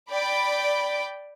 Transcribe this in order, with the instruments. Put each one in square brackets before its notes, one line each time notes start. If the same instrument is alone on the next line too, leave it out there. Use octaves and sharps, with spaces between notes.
[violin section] D5 G5 B5 D6